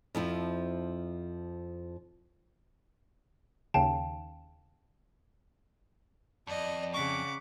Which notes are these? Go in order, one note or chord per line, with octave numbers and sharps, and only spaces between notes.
F2 F3 E4
D#2 C#3 F5 G5 A5
F2 D5 D#5
C#3 F#5 C#6 D6 B6